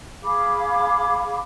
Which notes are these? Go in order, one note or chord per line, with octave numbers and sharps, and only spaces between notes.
G#4 F5 B5 D6